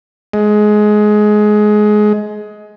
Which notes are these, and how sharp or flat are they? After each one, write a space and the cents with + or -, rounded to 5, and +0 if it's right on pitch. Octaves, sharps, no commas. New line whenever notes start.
G#3 +20